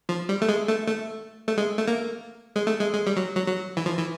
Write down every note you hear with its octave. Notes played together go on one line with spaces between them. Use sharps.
F3
G3
A3
G#3
A3
A3
A3
G#3
A3
A#3
G#3
A3
G#3
G#3
G3
F#3
F#3
F#3
E3
F3
E3